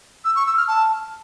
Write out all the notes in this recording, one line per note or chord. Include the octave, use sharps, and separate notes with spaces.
E6
C#6
E6
F6
A5